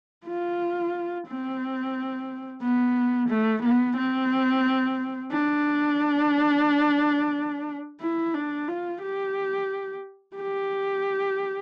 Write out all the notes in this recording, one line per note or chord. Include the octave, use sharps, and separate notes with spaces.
F4
C4
B3
A3
B3
C4
D4
E4
D4
F4
G4
G4